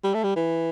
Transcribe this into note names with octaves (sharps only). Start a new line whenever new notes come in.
G3
A3
G3
E3